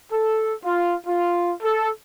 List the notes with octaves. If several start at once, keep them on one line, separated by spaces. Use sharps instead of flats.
A4
F4
F4
A4